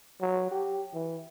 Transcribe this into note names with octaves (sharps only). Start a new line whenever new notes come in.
F#3
G4
E3